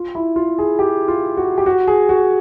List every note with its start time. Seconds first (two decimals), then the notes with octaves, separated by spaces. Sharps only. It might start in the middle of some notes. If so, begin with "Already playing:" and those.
Already playing: F4
0.15 E4
0.36 F4
0.58 G#4
0.79 G4
1.08 F4
1.37 F#4
1.58 G4
1.66 F#4
1.87 G#4
2.09 F#4